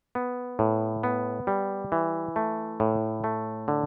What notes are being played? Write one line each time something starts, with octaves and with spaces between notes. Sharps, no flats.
B3
A2
B3
G3
E3
A3
A2
A3
D3